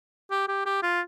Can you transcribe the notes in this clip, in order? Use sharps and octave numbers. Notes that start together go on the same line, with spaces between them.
G4
G4
G4
F4